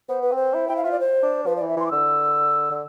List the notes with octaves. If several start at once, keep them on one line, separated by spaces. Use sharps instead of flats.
B3 C5
B4
C4
C5
E4
E4 G5
F5
F4 E5
D5
C5
D4
F3 B4
E3 D5
E5
E3 C6
D6
D3 E6
D3